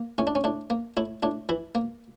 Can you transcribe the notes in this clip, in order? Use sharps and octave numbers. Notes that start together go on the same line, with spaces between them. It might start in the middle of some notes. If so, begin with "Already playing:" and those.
Already playing: A#3
A2 C#4
D4
C#4
A2 D4
A#3
A2 E4
A2 D4
E3 E4
A#3